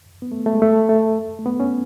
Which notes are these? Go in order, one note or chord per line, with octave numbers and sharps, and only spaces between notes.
B3
A3
A3
G#3
A3
A3
A3
B3
C#4